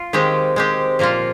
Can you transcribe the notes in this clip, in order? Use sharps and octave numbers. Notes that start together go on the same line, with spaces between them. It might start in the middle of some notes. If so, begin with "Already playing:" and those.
Already playing: F4
D#3 G#3 C4 G4
G#3 C4 G4
A#2 F3 A#3 F4